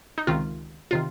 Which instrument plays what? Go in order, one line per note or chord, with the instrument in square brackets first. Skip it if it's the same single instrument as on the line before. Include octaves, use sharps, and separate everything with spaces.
[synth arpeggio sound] D#4
C#2 C3 D#3 F4
C3 D#3 F4